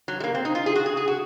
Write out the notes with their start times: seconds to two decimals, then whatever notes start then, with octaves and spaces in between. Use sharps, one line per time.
0.08 F#3
0.20 G#3
0.24 A#3
0.35 C4
0.45 D#4
0.55 F4
0.66 G#4
0.75 F#4
0.86 G#4
0.97 G#4
1.08 F#4